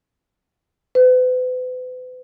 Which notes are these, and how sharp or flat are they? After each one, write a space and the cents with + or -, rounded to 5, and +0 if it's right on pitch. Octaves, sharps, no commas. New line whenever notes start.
B4 +40